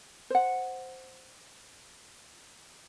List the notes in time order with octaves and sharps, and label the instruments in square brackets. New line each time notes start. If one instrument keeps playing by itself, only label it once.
[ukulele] C5 F#5